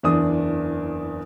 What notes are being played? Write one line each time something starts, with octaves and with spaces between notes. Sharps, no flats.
F#1 E2 D4 D#6